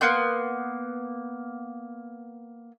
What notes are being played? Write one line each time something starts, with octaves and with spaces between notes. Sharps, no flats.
A#3 B3 C6 G6